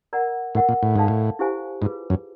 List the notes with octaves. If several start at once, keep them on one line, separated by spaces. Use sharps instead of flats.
A#4 D5 F#5 A#5
A2 A#4 D#5 F#5
A#2
A2
G#2 A4 D5 F5 A5
A2
E4 G4 C5 F5 G#5
G#2 F4 G#4 B4
F#2